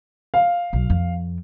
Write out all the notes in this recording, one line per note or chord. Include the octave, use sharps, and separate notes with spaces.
F5
B1
F2